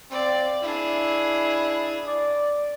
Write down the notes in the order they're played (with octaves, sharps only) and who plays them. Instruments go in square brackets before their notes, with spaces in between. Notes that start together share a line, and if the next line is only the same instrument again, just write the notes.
[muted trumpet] C4 [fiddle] D5 F5
[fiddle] D4 G#4 [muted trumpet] E4
[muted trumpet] D5